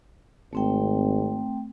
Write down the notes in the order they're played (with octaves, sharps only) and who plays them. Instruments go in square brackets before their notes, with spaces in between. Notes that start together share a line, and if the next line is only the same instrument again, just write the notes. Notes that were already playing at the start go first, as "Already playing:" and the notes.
[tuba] G#1 [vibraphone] A3 C4 G5